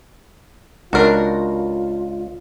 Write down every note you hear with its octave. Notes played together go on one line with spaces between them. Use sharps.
C#2 D4 F4 F#4 A#4